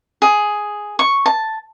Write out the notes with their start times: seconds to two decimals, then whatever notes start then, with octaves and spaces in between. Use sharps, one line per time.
0.22 G#4
0.99 C#6
1.26 A5